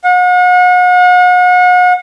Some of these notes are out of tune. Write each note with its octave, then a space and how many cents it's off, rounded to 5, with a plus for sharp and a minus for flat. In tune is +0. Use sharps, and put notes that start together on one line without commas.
F#5 -40